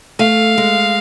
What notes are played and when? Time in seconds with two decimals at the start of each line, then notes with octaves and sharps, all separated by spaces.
0.19 A3 F5
0.58 G#3